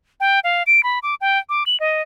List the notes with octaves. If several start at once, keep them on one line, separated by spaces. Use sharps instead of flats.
G5
F5
D7
B5
D6
G5
D6
F#7
D#5